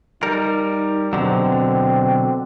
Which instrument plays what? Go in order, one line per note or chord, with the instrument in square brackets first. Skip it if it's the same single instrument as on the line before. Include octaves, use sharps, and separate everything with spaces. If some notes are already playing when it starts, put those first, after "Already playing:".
[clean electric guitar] G3 A#4 [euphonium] D#4
[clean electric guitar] B2 D3 F#3 [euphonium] C4